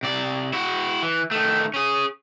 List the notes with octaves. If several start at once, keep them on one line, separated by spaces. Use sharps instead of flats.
C3 D5
E4 F#4
E3
D#3 A3
C#4 G#4